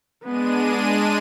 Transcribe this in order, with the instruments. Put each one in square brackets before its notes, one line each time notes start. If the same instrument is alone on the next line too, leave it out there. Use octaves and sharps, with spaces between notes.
[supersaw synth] G#3 D4 D#7 [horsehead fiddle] B3